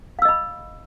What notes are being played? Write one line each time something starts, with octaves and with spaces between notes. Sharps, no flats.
D#5 F5 B5 E6